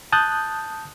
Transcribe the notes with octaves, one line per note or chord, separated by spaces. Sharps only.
A5 D#6 F#6 G6